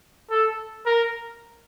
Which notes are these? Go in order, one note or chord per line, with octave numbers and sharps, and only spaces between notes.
A4
A#4